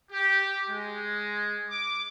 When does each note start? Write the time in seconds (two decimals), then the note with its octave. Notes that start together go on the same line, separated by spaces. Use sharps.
0.10 G4
0.69 G#3
1.69 D6